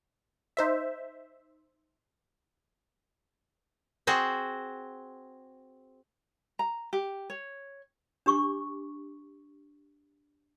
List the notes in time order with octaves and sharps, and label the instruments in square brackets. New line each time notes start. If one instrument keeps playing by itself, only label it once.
[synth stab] D#4 C5 E5
[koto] C4 F#4 G#4 C5
[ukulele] A#5
G4
C#5
[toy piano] D4 G4 C#6 D6